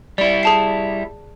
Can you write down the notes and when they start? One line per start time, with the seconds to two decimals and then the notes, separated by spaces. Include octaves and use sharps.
0.18 G3 E4 D5
0.43 G#4 A5 C7